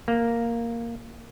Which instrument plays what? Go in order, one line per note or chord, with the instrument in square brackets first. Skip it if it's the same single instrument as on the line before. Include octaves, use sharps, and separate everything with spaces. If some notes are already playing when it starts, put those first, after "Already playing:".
[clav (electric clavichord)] A#3